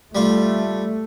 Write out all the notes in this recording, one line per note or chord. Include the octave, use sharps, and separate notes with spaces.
G3 A3 F4